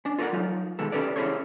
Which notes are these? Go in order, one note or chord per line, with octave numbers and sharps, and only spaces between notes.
C#4 D4
F4 A4 A#4 C#5 D5 F#5
F#3 D#4 F4
B2 D#3 G#3 A4
C#4 D4 G4 A4 B4 D5
C#4 E4 G#4 A4 C5 C#5